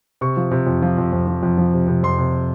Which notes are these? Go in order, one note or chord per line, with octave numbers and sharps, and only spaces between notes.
C3 C#6
F3
C3
F2
F3
F2
F2
F3
F2
F3
C3
C3
F2 C6
C3